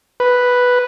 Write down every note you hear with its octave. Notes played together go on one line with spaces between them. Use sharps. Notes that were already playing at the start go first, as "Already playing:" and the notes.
B4